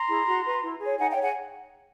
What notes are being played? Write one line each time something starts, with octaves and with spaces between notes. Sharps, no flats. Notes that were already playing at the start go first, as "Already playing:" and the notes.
Already playing: A#5 C6
E4 G#4
F#4
B4
E4
G#4 C#5
D#4 F#5 G#5
F5 G5
C#5
G#4 F#5 G#5